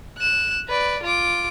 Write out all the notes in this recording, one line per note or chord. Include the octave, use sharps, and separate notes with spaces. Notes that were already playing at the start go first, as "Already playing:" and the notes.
F#6 E7
B4 D5
F4 D6